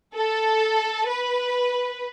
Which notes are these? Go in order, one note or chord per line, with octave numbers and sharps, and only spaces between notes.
A4
B4